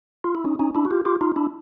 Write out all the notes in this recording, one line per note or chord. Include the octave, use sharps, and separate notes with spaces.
F4
E4
C#4 D#4
C#4 D#4
D4 E4
F#4
F4 G4
F4 G4
D#4 F4
D4 E4